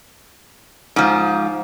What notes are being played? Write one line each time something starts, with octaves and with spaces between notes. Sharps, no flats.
G#2 F3